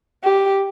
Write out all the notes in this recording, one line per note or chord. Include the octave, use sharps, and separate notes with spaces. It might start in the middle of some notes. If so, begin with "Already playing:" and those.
G4